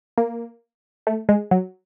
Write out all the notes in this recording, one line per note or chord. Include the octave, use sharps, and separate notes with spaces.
A#3
A3
G#3
F#3